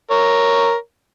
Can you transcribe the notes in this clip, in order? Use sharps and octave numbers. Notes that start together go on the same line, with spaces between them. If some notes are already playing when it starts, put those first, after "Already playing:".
A#4 C#5